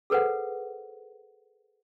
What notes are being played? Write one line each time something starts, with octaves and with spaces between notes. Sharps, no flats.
G#4 A4 B4 C5 F#5